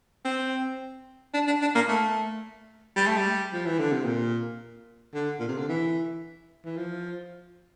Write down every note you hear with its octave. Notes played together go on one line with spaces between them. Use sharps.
C4
D4
D4
D4
A#3
A3
G3
A3
G3
F3
E3
D3
C3
A#2
D3
A#2
C3
D3
E3
E3
F3